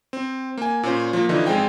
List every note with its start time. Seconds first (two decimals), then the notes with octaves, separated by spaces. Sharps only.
0.13 C4
0.57 A#3 G#5
0.83 A#2 C#4 C5
1.13 F3 A#3
1.29 D3 E3 F3 D#4
1.47 G#1 G#3 C4 G#4 G5